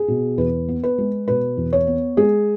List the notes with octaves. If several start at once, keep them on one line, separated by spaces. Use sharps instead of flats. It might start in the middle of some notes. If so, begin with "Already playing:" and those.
Already playing: G#4
B2
E2 B4
B3
B4
G#3
B2 B4
E2
C#5
B3
G#3 G#4